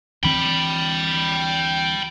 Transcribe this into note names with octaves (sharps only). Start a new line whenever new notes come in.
D2 E3 C4 G5 B5